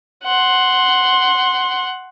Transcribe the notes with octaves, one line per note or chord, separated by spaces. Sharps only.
F#5 C6